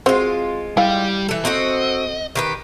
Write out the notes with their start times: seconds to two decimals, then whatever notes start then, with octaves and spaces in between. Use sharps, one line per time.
0.06 G#3 C4 F4 F#4 C5
0.77 G3 E4 G4 F5
1.29 E3 A4
1.45 C4 F#4 A4 D#5
2.35 D#3 G4 B4